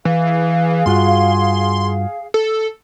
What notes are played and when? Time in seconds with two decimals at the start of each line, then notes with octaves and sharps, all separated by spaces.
0.05 E3 G#4 F5
0.86 G2 F4 F#4 C6
2.34 A4